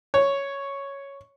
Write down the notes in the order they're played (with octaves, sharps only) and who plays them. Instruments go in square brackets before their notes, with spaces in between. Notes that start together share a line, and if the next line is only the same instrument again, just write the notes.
[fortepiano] C#5